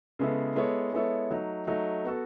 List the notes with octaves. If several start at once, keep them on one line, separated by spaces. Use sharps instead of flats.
C#3 G#3 B3 E4 A4
G#3 B3 E4 A4 C#5
G#3 B3 E4 A4 C#5
F#3 A3 D#4
F#3 A3 D#4
B3 F#4 A4